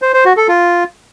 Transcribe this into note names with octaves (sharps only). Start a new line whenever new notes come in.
C5
C5
F#4
A4
F4